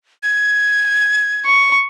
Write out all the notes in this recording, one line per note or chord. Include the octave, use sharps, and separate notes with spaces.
G#6
C#6